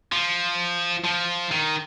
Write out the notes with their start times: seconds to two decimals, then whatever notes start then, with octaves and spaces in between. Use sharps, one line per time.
0.12 F3
1.05 F3
1.52 D#3